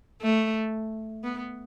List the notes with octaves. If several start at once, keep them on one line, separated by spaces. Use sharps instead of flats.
A3
B3